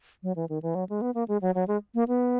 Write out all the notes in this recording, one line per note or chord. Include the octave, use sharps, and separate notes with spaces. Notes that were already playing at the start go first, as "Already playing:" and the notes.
F#3
E3
D#3
E3
F#3
G#3
B3
A#3
G#3
F#3
F#3
G#3
A#3
B3